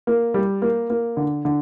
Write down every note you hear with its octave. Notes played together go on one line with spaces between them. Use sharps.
A#3
G3
A#3
A#3
D3
D3